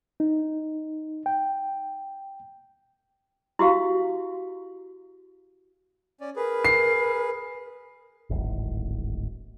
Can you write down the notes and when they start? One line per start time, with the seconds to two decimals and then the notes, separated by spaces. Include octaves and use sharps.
0.20 D#4
1.26 G5
3.59 E4 F#4 G4 F5
6.21 C#4 D5
6.36 G#4 A#4 B4
6.65 C7
8.30 D1 G#1